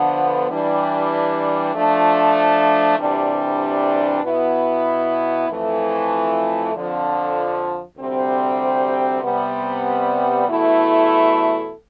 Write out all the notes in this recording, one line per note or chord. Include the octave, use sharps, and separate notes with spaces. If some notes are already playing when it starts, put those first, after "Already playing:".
Already playing: D3 F3 B3
E3 G3 D4
F3 A3 D4
D2 C3 E3 G3 D4
B2 B3 E4
F2 E3 A3
F2 D3 F3
D2 C3 G3 C4
C3 G3 B3
E2 B2 A3 E4 A4